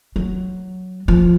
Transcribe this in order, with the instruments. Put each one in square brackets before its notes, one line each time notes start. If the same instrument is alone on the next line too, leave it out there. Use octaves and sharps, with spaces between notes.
[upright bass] F#3
F3